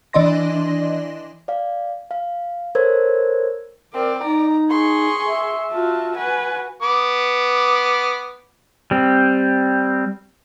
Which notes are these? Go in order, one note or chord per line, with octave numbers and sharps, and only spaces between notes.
E3 D4 D5 D#5 C6 A#6
D5 F5
F5
A4 A#4 C5 C#5 E6 G#6
C4 A#4 D5
D#4 A#5
G#4 C6 C#6
E5
F4 F#4 A5
F#4 B4 G#5
B3 D6
G3 C4